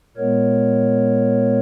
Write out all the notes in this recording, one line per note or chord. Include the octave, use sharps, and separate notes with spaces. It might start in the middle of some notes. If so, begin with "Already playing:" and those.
A#2 G#3 B3 A#4 C#5